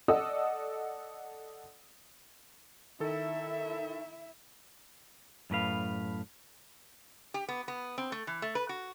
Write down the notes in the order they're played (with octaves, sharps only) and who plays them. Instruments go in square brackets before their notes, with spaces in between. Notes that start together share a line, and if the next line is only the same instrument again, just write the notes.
[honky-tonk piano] A4 D5 D#5 F#5 D#6 E6
[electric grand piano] D#3 A4 [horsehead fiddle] E4 E5
[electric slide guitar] F#2 A2 B4 F5
[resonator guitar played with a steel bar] G4
B3
B3
C4
A3
E3
A3
B4
F#4